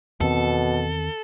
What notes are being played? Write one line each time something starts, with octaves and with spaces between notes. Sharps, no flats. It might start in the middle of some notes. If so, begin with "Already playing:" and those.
E2 B2 D#3 C4 A4